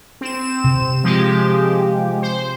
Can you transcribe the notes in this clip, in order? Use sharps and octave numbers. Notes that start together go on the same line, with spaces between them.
C4 E7
C3
F3 G#3 G4
C5